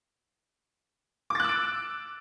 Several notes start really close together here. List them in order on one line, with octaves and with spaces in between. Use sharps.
D6 A6 F#6 E6 D7